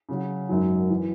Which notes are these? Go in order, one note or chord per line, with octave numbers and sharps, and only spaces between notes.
C#3 F#3 C#4 F#4
G#1 F#2 D#3 F#3
E3